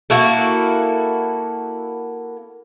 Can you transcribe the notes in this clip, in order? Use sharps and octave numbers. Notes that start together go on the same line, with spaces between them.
A#3 E4 F#4 A4